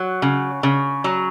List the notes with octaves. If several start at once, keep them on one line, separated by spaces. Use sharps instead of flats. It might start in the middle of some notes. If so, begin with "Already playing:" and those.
Already playing: F#3
C#3
C#3
F#3